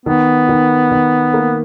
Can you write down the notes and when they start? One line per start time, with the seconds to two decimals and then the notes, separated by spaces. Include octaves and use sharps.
0.06 D#3 B3
0.49 D#3
0.92 D#3
1.34 A#3